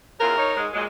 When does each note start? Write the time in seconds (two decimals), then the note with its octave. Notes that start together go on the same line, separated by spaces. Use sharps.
0.20 E2 C#3 F4 A#4
0.37 D#4 C#5
0.55 G#2 G#3
0.73 A#2 F#3 G#3